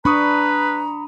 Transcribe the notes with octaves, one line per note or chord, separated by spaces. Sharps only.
D4 B4 A#5 B5 C#6 D#6